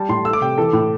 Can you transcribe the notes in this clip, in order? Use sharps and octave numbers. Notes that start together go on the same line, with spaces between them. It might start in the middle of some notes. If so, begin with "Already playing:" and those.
Already playing: G3 A5
A2 C6
A3 E6
D6
C3 G5
E3 A4
A2